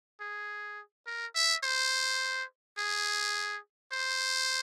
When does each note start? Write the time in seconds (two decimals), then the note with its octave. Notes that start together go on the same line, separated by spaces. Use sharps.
0.21 G#4
1.06 A#4
1.35 E5
1.64 C5
2.78 G#4
3.92 C5